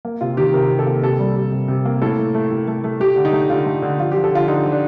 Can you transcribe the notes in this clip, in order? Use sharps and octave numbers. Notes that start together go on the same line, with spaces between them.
A#3
C3 F4
D#3 G4
C3 A#4
C3
A4
A#3
C3 A4
G3
G3
C3
C3
A#3
A2 A4
A3
A3
A2
A3
A3
A3 G4
D3
D#4
A3
D3 F4
A3
D3
F3 F4
F3 G4
A4
D3 F4
D3 D#4
F3
D4